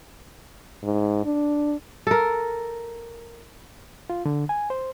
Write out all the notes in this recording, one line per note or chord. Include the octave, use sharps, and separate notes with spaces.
G#2
D4
A4 A#4
F4
D3
G#5
C5